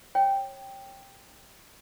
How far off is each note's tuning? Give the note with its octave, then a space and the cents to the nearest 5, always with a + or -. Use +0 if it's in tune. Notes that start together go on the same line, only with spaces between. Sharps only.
C#5 -25 G5 +0